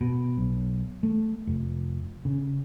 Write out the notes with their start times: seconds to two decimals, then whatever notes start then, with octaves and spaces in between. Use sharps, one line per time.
0.01 B2
0.37 B1
1.03 A3
1.47 F1
2.25 C#3